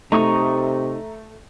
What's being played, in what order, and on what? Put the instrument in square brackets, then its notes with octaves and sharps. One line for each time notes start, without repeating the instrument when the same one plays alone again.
[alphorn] C3 [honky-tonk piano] A3 [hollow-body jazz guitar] D#4 [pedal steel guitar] A#5 C#6 D#6